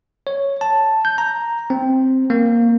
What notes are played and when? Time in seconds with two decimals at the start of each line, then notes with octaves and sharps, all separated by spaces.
0.27 C#5
0.61 A5
1.05 G6
1.18 A#5
1.70 C4
2.30 A#3